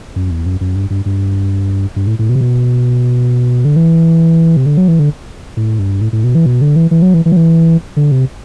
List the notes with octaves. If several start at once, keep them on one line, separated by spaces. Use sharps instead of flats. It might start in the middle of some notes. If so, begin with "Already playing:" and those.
F#2
E2
F#2
F#2
G2
G2
G2
G2
A2
A2
B2
C3
B2
D3
E3
C3
D3
F#3
E3
D3
A2
G2
A2
A2
B2
E3
B2
D3
E3
E3
F#3
E3
E3
F#3
E3
D3
C3